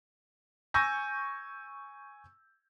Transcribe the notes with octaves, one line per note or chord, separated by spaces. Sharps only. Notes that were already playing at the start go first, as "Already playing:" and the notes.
G#5 C#6 E6 G6 A#6